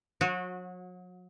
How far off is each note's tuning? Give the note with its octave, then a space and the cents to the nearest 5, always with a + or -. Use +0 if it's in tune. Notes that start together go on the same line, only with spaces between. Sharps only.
F#3 -35 F#4 -20